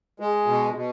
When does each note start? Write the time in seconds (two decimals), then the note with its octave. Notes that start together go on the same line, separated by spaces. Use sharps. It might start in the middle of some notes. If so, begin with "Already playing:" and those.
0.20 G#3
0.46 B2
0.74 B2